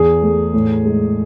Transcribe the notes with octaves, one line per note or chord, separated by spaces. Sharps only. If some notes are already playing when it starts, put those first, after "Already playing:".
Already playing: E2 G#4
A3
A2
G#3